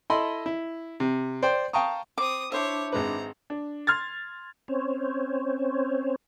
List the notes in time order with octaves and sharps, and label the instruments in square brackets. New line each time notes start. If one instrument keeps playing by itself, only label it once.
[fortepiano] E4 A4 D#5 B5 C6
E4
C3
C5 D5 G5 C6
F5 G5 A5 A#5 C#6 D#6
[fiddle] C4 D#6 [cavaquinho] D6
[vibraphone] D4 A5 D6 [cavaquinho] E4 C5 E5 [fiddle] C#5
[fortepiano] G#1 G#3 B4 [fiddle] A#5
[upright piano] D4
C6 F6 G#6 A6
[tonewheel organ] C4 C#4 C5 C#5